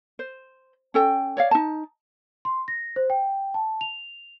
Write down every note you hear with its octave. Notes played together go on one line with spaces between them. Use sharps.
C5
C#4 A4 G5
C#5 D5 F5
D#4 A5
C6
A#6
C5
G5
A5
F7